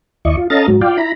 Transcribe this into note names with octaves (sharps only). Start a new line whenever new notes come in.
D#2 E4 D5 D#5 C#6
F4
C#4 A4 D#5 F5 A#5 A6
G#2 F#3
F4 D5 F5 G5
E4 A#5 B5